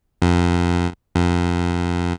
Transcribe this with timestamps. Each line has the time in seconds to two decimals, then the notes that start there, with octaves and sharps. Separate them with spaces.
0.22 F2
1.15 F2